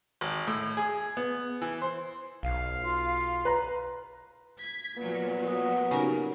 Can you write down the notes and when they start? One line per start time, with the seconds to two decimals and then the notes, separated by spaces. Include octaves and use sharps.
0.21 G#1
0.47 A2
0.77 G#4
1.17 B3
1.62 E3
1.82 C5
2.43 B1 F5
2.83 F4
3.45 B4 A#5
4.58 G#6 B6
4.98 A#2 F#3 B3
5.47 F#4 F#5 D#6
5.91 C#3 D#4 F#4 G4 A#4